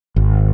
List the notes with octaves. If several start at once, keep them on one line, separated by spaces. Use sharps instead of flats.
G#1